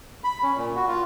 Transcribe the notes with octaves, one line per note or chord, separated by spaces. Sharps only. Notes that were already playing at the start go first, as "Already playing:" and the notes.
B5
C#4
A#2
F#4
F4